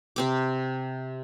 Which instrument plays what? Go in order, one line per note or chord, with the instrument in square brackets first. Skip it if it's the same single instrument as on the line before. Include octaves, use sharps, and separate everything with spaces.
[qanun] C3 C4 D6